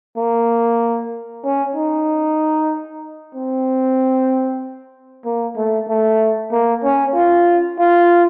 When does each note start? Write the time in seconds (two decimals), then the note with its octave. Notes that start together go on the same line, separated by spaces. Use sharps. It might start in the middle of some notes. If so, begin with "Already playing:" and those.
0.17 A#3
1.44 C#4
1.76 D#4
3.35 C4
5.25 A#3
5.57 A3
5.89 A3
6.52 A#3
6.84 C#4
7.15 F4
7.79 F4